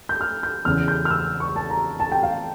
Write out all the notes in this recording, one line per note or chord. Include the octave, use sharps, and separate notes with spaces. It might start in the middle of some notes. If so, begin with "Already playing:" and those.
G6
F6
G6
E2 C#3 E3 F6
G6
F6
E6
C#6
A5
A#5
A5
G5
F5